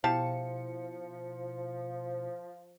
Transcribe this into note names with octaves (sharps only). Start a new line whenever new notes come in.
B2 F3 E4 G4 F5 A5 C#7